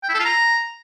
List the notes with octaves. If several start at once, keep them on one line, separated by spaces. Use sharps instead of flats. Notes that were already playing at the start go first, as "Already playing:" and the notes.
G5
E4
A4
F4
A#5